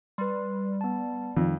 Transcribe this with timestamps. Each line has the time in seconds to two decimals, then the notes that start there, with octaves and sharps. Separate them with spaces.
0.18 G3 B4 C6
0.81 B3 A5
1.37 F2 D#3